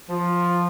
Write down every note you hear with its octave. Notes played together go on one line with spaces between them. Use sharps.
F3